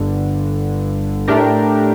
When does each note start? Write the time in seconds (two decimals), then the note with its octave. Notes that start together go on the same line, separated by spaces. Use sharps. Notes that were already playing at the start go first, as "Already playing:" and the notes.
Already playing: G1 G2 D3
1.28 A2 A3 D4 G4 A#4